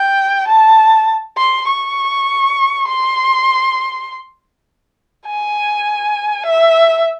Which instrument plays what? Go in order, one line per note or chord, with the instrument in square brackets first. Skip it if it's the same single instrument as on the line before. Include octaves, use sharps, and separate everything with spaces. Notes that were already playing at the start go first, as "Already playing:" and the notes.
Already playing: [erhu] G5
A5
C6
C#6
C6
G#5
E5